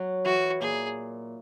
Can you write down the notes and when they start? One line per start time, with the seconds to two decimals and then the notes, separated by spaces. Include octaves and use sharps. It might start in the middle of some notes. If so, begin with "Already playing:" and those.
Already playing: F#3
0.24 E3 F#4
0.60 A#2 G#4